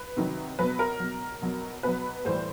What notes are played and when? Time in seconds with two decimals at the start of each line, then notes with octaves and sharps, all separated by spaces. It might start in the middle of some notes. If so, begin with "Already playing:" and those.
Already playing: B4
0.17 C3 D#3 F#3
0.59 B2 F#3 B4
0.79 A#4
1.00 B2 F#3
1.42 B2 F#3
1.83 B2 F#3 B4
2.25 A2 E3 G3 C5